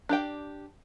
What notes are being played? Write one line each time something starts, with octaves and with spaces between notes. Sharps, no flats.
D4 G4 G5